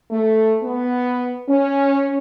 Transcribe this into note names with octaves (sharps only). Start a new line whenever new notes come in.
A3
B3
C#4